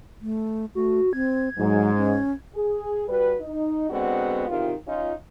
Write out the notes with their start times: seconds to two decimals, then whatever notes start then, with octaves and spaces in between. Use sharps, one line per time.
0.22 A3
0.75 A3 F#4
1.13 C4 G#6
1.57 G#2 F#3
1.96 C#4
2.55 G#4
3.08 G3 F#4 B4
3.41 D#4
3.90 D3 G#3 B3 C4 F#4
4.48 E2 C3 D#3 F4
4.87 C#4 D#4 F4